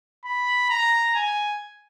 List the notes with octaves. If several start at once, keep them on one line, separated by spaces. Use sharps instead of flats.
B5
A#5
G#5